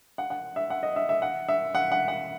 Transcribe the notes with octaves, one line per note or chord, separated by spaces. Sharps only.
F#5
F#5
E5
F#5
D#5
E5
E5
F#5
E5
F#5
F#5
F#5